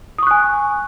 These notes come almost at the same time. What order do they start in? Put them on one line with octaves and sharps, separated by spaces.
D#6 C#6 F#6 G#5